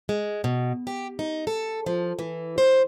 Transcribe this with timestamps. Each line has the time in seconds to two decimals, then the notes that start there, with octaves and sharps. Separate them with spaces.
0.09 G#3
0.44 B2
0.87 G4
1.19 D#4
1.47 A4
1.86 F3
2.19 E3
2.58 C5